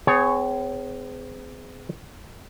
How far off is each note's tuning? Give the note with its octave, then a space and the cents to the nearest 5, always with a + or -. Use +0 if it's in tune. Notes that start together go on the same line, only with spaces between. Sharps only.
C4 -45 G#4 +0 C#5 +0